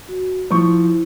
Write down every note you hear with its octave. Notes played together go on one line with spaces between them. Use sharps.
F#4
F3 E4 C#6